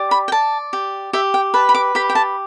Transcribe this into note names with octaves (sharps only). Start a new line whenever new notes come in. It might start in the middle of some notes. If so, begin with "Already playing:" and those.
Already playing: G4 D5
B5
G5
D5 A5
G4
G4 E5
G5
B4 A5
B5
D6
G4 B5
G5
A5